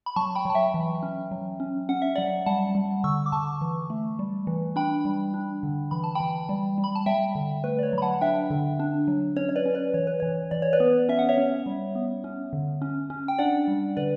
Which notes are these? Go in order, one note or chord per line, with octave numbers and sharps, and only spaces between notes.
B5
F#3 A5 C#6
G5 B5
F#3 A5
E5 G5
E3
C#4
F#3
C#4
C#4 F#5
E5
F#3 D5 F#5
G3 F#5 A5
G3
D3 C#6 E6
D6
D3 A5 C#6
E3
A3
G3
E3
D4 G5 B5
G3
D4
D3
E3 B5
A5
E3 G5 B5
G3
G3
B5
A5
G3 E5 G5
D3
A3 B4
D5
C#5
F#3 B5
F#5 A5
D4 E5 G5
D3
D4
F#3
C#4 C#5
C#5
B4 D5
C#4
B4 D5
E3 C#5
B4
E3 C#5
E3 D5
C#5
B4 D5
B3
C#4 E5
F#5
C#5 E5
C#4
G3
B3
C#4
D3
C#4
C#4
G5
D4 D5 F#5
G3
D3 B4 D5